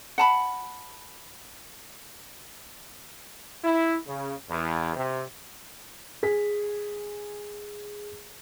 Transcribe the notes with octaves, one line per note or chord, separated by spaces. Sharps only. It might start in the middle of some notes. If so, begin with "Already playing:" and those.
F#5 A5 B5
E4
C#3
E2
C3
G#4 B6